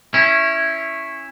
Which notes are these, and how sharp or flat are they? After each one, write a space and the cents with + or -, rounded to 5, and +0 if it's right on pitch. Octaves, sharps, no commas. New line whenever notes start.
C#4 -10 E4 +0